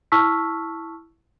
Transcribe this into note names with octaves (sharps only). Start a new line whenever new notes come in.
E4 A5 C#6 E6 F6 B6